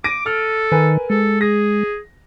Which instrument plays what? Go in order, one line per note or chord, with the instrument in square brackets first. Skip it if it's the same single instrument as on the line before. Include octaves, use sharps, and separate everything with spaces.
[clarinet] D6 [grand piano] A#6 D7 D#7
[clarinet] A4 [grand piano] F6
[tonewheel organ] D#3 [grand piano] A#4 B4 G#5
[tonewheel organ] G#3 [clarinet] A4
[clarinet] G#4 [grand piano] A#6